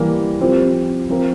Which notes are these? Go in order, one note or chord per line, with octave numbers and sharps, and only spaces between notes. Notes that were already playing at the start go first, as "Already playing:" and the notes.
Already playing: E3 G3 A#3
F3 C4 G4
F3 C4 F4 A#4